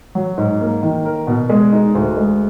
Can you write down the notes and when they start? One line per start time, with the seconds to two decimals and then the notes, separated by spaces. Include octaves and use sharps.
0.15 F#3
0.38 G#2
0.61 A#3
0.83 D#3
1.05 A#4
1.27 B2
1.49 G#3
1.72 D#4
1.95 D2
2.17 G#3